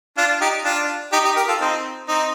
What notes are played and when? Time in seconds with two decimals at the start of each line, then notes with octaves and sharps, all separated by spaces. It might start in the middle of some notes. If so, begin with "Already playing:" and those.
0.17 D4 F4
0.41 D#4 G4
0.65 D4 F4
1.13 D#4 G4
1.25 D#4 G4
1.36 G4 A#4
1.48 F4 A4
1.61 C4 D#4
2.08 C4 D#4